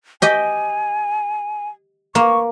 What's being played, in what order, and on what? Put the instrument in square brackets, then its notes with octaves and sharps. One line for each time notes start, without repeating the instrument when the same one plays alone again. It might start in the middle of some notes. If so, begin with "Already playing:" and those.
[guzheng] G4 D#5 G5 [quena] G#5
[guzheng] A#3 [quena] C#6